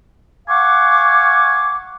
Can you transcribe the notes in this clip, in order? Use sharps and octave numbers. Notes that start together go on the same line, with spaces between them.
F5 F#5 G#5 C#6 D6